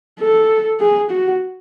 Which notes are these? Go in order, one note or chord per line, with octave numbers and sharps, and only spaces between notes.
A4
G#4
F#4